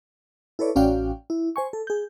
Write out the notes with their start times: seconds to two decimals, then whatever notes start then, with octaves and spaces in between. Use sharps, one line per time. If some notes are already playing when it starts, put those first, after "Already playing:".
0.59 E4 A4 B4 C#5 D5
0.76 A1 C#4 F#4 D5 F5 G5
1.30 E4
1.56 C5 G#5 C#6
1.73 A4
1.87 G#4 G6